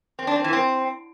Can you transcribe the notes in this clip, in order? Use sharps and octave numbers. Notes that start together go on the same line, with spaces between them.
C4
D4
C4
E3
C4